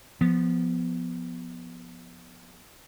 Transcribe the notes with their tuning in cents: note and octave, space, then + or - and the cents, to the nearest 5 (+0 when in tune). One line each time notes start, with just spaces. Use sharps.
F3 +0 B3 +0